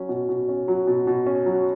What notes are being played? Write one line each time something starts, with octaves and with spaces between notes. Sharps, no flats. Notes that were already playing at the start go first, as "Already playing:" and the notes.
Already playing: F#3 C#4
B2
B2
C#4
F#3
B2
B2
C#4
F#3